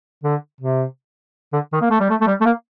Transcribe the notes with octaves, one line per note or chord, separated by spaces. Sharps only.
D3
C3
D3
D#3
A#3
A3
G3
A3
A3
G3
A3
A#3